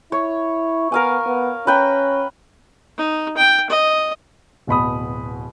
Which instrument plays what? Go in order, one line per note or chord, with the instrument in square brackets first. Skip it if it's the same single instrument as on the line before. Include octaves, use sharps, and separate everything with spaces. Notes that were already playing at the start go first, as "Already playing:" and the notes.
[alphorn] E4 [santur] C#5
[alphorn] B3 [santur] A#4 F5 G#5
[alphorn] B3
[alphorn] C#4 [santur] B4 G5 A#5
[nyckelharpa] D#4
G5
D#5
[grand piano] D1 B2 B5 D#6